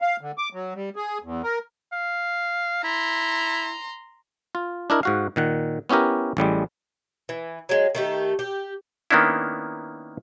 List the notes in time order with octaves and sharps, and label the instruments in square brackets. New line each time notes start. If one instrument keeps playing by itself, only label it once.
[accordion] F5
D3
D6
F#3
G3
G#4
E2
A#4
[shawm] F5
[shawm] E4 [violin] A#5 C6
[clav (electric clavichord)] F4
D4 E4 A#4 D#5
G#2 F#4 F5
A#2 D#3 F#5
B3 C#4 E4 G4 A#4
A1 A2 G3 G#3
[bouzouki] E3
F#3 G#3
D#3 A3 G4
G4
[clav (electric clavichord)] D#3 A#3 B3 C#4 D4 E4